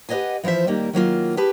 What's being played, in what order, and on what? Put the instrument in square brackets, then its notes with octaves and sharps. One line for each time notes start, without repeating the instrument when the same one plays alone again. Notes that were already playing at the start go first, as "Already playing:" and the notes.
[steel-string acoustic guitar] G4 B4 C#5 D#5 F#5 G#5
E3 F3 F4 C5 E5
D#2 D#3 G3 A#3
D#3 F#3 A#3 F4
G4 G#4 B4 A5